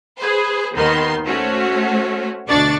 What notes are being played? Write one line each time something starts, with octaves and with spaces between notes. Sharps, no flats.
G#4 B4 C5
D#2 D#3 B3 C6
A3 C#4 F#4 C5 C#5
D2 B2 D4 D5 C#6 A6